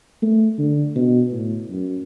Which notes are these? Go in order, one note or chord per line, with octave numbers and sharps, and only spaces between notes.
A3
D3
B2
A2
F#2